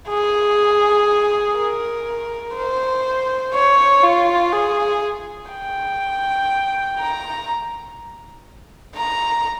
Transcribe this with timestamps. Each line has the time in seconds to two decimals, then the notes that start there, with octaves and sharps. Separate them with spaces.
0.09 G#4
1.57 A#4
2.56 C5
3.54 C#5
4.03 F4
4.52 G#4
5.51 G5
6.99 A#5
8.95 A#5